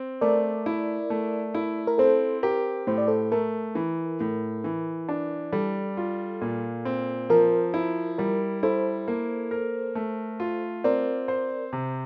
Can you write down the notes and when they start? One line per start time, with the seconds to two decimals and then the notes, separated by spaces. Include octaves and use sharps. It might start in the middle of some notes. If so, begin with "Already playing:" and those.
Already playing: C4
0.21 A3 A#4 D5
0.66 E4
1.10 A3
1.55 E4
1.87 A#4
1.98 C4 A4 C5
2.43 G4 A#4
2.87 A2 C5
2.98 D5
3.08 A4 C5
3.32 A3 A#4
3.75 E3
4.20 A2
4.64 E3
5.09 D4
5.53 G3 A4
5.97 F4
6.41 A#2
6.85 C4
7.30 F3 A#4
7.74 E4
8.18 G3 A#4
8.63 E4 A4 C5
9.08 A#3
9.51 A#4
9.95 A3
10.40 F4
10.84 C4 A#4 D5
11.28 C5
11.73 C3